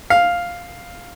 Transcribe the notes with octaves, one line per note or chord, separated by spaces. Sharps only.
F5